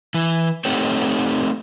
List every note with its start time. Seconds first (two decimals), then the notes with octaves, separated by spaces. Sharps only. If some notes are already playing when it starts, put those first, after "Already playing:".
0.14 E3
0.65 A3 C4 D#4 G4 A4 C#5